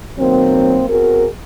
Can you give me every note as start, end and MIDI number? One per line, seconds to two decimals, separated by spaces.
0.18 0.84 47
0.18 0.84 51
0.18 0.84 54
0.18 0.84 58
0.18 0.84 60
0.89 1.26 59
0.89 1.26 60
0.89 1.26 66
0.89 1.26 68
0.89 1.26 70